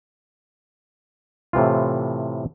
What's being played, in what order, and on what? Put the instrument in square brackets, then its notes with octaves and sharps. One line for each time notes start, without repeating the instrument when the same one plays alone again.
[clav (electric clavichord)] A2 C3 E3 F4